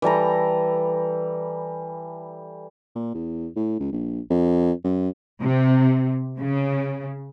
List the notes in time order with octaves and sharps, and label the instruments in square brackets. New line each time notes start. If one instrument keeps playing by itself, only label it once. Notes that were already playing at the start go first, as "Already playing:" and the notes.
[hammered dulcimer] E3 G3 A4 A#5
[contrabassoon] A#2
E2
A2
C#2
A#1
F2
F#2
[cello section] C3
C#3